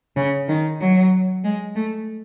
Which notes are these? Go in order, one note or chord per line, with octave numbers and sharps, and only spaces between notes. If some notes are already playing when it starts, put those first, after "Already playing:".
C#3
D#3
F#3
G#3
A3